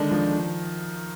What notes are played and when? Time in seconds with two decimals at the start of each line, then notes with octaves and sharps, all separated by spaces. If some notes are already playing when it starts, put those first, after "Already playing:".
Already playing: D3 D#3 G#3 D4
0.11 F3